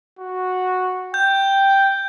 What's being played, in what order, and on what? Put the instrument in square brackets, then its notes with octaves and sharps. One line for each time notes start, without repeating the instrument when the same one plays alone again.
[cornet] F#4
[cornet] G5 [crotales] G6